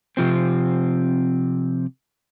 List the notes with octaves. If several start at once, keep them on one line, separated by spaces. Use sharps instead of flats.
C3 F3 C4